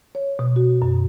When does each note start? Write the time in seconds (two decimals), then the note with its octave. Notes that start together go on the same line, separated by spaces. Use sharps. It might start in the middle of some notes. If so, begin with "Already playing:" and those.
0.15 C#5
0.39 B2
0.56 F#4
0.82 F#2